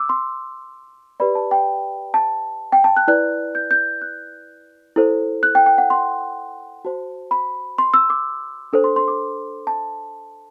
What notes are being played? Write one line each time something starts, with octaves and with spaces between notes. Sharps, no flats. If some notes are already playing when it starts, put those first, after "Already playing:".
Already playing: D6 E6
C6
G4 B4 D5 B5
A5
G5
A5
G5
A5
F#6
E4 B4 D5 F#6
G6
G6
F#6
E4 A4 C5
F#6
G5
G5
F#5
C6
F#4 C5 A5
B5
C6
E6
D6
D4 A4 C5
C6
C6
D6
A5